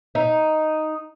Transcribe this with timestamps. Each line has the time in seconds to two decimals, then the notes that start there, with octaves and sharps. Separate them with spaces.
0.15 D#4